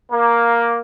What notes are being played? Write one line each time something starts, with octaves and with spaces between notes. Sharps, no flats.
A#3